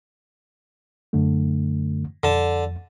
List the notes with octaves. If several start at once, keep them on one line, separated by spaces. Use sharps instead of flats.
F#2 D3 A3
F2 D3 A5